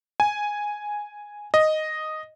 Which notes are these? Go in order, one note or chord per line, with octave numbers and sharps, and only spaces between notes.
G#5
D#5